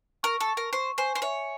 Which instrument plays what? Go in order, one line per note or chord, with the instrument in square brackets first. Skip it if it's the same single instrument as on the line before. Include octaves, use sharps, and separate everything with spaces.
[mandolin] A#4 [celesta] C#6
[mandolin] A4
[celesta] C#6
[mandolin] A#4
[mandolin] C5 [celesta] C#6
[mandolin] C5 [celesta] G#5
[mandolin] C5
[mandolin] C#5 [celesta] E5